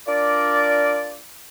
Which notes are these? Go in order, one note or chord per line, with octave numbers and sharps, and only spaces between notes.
D4 F4 A#4 D5